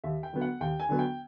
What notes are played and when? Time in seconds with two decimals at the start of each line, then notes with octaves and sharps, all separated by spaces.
0.04 D#2 E5
0.23 G5
0.33 D3 F#3 B3
0.41 F#5
0.61 D#2 G5
0.80 G#5
0.89 D3 F#3 B3
0.99 G5